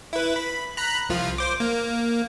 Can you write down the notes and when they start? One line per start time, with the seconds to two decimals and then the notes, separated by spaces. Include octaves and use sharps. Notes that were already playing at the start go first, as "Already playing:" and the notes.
0.13 E4 B4
0.36 B5
0.77 A#5 B5 F#6
1.09 C2 F3 F4
1.38 C5 D6
1.60 A#3